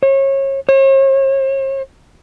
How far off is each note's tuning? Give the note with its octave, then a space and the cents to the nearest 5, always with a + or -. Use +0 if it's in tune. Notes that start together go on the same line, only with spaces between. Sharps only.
C#5 -30
C#5 -45